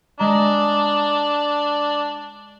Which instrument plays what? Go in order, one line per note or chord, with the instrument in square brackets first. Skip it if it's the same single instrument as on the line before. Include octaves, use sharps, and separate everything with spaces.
[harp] G#3 A#5 [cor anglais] D4